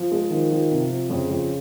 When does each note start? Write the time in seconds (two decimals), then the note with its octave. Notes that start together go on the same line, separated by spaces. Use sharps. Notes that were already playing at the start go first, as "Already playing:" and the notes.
Already playing: F3
0.12 G#3
0.31 D#3 F3
0.51 F3
0.71 C3
0.90 F3
1.10 F2 C#3
1.30 F2